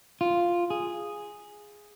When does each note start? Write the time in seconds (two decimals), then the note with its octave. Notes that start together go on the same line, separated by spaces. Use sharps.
0.21 F4
0.70 G#4